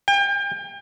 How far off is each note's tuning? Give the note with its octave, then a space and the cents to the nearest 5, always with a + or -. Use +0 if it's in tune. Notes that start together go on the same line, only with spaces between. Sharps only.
G5 +35